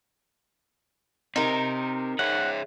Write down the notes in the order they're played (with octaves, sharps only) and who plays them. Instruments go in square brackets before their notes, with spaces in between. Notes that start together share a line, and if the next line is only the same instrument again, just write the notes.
[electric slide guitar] C4 G4 [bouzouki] D#4 A#4
[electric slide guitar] G#4 C#5 E5 [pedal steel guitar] F#5